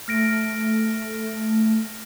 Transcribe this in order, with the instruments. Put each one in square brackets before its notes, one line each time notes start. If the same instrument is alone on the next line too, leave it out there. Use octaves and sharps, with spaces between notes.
[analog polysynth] A3 [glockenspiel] F6 A#6 D7